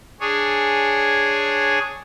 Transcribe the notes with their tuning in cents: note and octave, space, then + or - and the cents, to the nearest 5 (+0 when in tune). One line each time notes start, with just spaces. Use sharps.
D4 +0 G#4 +0 C#5 -5